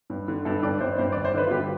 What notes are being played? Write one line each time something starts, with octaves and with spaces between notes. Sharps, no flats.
G2
D3
G2 A4
G2 D5
G2 C5
G2 C5
D5
G1
C5
D3 B4
F4
G2 G4